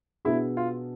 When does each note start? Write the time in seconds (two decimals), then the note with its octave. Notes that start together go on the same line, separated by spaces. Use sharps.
0.25 B2 B3 D4 E4 G#4
0.57 F4